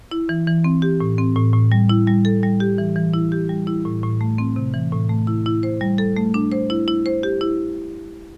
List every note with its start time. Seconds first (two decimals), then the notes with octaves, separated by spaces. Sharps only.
0.11 E4
0.29 E3
0.47 E3
0.64 C4
0.82 G4
1.00 A2
1.18 C4
1.36 A2
1.53 A2
1.72 G3
1.89 E4
2.07 G3
2.25 A4
2.43 G3
2.60 G4
2.78 E3
2.96 E3
3.14 E4
3.32 G4
3.49 G3
3.67 E4
3.85 A2
4.03 A2
4.21 A3
4.38 C4
4.56 C3
4.74 E3
4.92 A2
5.09 A3
5.27 E4
5.46 E4
5.63 C5
5.81 G3
5.98 A4
6.16 A3
6.34 D4
6.52 C5
6.70 E4
6.88 E4
7.06 C5
7.23 G4
7.41 E4